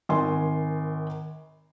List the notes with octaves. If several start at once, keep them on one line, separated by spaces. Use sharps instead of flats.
G#1 A#4 G#5 C6